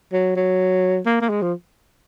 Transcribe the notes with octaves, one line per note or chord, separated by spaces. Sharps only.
F#3
F#3
A#3
A#3
G#3
F3